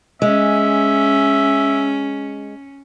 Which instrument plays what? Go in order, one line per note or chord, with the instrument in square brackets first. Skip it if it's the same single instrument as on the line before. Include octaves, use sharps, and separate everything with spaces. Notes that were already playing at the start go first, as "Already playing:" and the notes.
[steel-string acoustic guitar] G#3 [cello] C#4 [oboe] E5